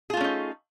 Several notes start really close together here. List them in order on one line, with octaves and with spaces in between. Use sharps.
G#4 F4 A3 C#4 D#4